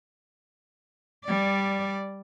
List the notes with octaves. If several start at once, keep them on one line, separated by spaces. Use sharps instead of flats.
G3 D5